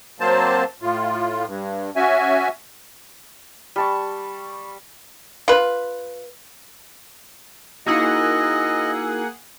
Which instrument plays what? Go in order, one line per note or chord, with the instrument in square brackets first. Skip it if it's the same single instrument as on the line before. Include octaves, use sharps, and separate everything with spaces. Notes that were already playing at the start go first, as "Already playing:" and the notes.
[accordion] F#3 A#3 C4 C5 A5
A2 F4
G2
C#4 F#4 E5 G#5
[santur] G3 A5 C#6
[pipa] F4 B4
[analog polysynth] A#3 G#4 F#5 [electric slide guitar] D#4 E4 F#4 [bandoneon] D#5 [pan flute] E6